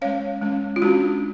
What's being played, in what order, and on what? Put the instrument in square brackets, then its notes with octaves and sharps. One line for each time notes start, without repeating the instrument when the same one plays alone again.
[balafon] G#3 C#4 C#5 F5
G#3 C#4
F4
G#3 C#4 D4 F#4